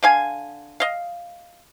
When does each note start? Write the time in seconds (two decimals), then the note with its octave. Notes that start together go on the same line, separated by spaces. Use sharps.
0.03 D3 F5 G#5
0.80 D#5 F5